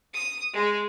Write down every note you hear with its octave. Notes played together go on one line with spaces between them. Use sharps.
D#6
G#3